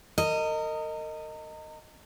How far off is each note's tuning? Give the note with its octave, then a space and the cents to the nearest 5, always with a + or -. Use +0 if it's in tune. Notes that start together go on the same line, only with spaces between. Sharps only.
A#4 -35 D#5 +0